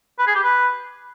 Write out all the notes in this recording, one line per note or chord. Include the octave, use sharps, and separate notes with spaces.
B4
G#4
G4
B4